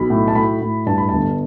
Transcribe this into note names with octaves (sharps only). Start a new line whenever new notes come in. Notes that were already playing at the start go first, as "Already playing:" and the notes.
Already playing: B1 B5
A2
A5
A2 B5
A2
G2 A5
B5
G1 A5